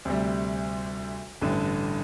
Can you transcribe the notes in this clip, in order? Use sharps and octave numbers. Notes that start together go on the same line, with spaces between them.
D2 C3 G3
A1 G2 D3